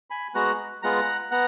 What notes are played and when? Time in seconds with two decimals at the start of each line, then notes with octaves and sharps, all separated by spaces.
0.10 G#5 B5
0.34 G#3 B3 F#4 F#5 A#5
0.83 G#3 B3 F4 F#5 A#5
1.31 B3 F#5 A#5